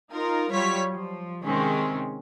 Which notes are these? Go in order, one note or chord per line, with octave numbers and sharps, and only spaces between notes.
D#4 F4 A#4
F#3 G3 F4 C#5 B6
F3
C3 D#3 G#3 C4 C#4